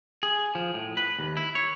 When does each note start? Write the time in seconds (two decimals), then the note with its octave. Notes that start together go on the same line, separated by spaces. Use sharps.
0.23 G#4
0.55 F3
0.74 A2
0.97 B4
1.19 D#2
1.37 E4
1.55 C#5